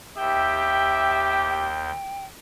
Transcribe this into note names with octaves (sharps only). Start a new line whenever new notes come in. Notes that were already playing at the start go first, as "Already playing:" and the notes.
D#2 G4 E5 G5 G6